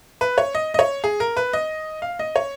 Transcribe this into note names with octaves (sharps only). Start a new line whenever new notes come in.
B4
C#5
D#5
D#5
C#5
G#4
A#4
B4
D#5
F5
D#5
C#5